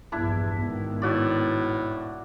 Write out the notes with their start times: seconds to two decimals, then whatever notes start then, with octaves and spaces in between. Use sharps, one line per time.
0.12 A#1 E2 G2 D4 E4
0.62 G#1 B2 D#3
1.02 A2 F#4 D5